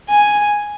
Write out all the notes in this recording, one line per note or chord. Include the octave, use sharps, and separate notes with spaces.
G#5